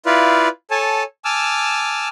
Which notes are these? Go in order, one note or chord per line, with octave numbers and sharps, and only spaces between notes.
E4 F4 B4 D5 F5
A4 C#5 G#5 A5
G#5 A5 D6 E6 F6